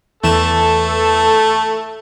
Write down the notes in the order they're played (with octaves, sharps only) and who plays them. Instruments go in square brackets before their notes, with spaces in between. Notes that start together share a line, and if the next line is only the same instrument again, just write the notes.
[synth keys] E2 E3 E7 [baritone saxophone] A3 [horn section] A4